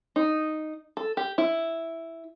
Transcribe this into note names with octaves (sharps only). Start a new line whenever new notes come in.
D#4
A4
G4
E4